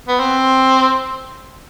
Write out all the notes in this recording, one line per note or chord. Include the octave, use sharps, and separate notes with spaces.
B3
C4